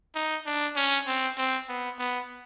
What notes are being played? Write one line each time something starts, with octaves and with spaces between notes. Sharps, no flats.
D#4
D4
C#4
C4
C4
B3
B3